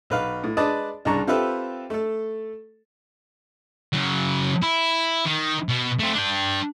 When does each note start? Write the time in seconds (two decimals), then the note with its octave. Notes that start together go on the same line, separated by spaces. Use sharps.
0.10 B1 B4 F5
0.44 A2
0.57 G#3 D4 B4 D5 A5 D#6
1.05 C2 G2 C#3 A5 A#5 C#6
1.27 C4 F4 G4 A4 B4 E5
1.90 A3 A4
3.94 C#3 F#3
4.62 E4
5.25 D#3
5.69 B2
5.99 A3 C4
6.14 D4 G5